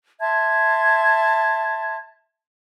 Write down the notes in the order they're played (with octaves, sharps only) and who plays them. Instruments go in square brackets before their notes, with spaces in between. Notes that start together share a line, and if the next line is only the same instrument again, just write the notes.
[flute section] E5 A5 C6 G#6